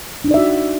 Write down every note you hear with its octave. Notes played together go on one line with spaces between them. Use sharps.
D4 D#4 F#4 D5 E5